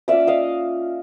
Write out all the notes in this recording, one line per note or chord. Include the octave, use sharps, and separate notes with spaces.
A#3 C#4 F4 D5 E5
D#5 F5